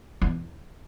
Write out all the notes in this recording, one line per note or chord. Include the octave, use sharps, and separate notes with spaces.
E2